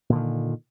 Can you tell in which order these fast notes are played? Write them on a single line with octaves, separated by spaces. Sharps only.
A#2 D3 D#3